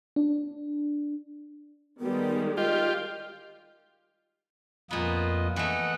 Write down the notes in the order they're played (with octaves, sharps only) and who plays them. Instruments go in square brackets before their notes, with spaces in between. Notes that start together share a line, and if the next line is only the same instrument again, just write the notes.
[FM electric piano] D4
[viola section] D#3 G3 G#3 [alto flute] B3
[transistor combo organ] F4 G4 [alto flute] D#5
[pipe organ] F2 F4 D#5 [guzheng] A#2 B3
[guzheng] E3 A3 [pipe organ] D#5 F#5